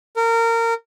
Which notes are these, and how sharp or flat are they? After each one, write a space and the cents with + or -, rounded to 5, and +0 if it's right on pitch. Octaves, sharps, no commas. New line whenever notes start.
A#4 -25